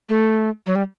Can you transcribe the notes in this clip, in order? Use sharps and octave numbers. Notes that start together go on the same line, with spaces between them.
A3
F#3
G3